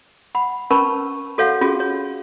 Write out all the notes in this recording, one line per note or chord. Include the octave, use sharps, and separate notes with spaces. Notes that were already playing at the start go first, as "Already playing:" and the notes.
F#5 B5
C#4 A#4 B4 A5 B5 C#6
F#4 A4 C#5 F5 F#5
C#4 F4 F#4 G#4
C#5